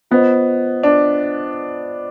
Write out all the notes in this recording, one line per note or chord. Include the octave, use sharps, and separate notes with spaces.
B3 F4 C5 D#5
D4